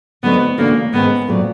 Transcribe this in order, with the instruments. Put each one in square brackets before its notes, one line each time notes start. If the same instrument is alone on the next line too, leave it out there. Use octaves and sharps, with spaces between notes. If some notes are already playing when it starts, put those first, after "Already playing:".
[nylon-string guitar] D3 F#3 A3 C4 D#4 [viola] B3
[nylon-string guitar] C#3 E3 A3 D4 F#4 [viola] A#3
[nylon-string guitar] G#2 D#3 G#3 C#4 [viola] B3
[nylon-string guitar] A#2 F#3 A3 C4